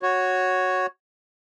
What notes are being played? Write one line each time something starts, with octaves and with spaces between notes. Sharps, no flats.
F#4 C#5